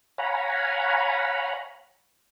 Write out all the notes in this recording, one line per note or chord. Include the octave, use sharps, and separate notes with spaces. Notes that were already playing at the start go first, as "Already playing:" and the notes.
C#5 F5 F#5 G#5 A#5 B5